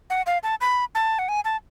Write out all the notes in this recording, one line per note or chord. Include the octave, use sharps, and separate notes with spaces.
F#5
F5
A5
B5
A5
F#5
G#5
A5